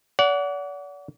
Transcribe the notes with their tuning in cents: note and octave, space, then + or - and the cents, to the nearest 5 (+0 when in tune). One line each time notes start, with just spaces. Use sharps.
D5 -40 F#5 +0